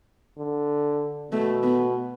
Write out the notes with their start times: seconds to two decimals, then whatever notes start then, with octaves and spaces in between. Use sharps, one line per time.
0.39 D3
1.31 B2 A3
1.63 B3